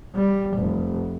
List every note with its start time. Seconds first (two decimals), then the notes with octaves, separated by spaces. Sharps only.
0.15 G3
0.57 F1